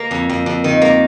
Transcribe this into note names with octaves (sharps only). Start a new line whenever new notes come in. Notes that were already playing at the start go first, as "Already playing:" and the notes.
Already playing: A#3
F2
F2
F2
D#3
A#3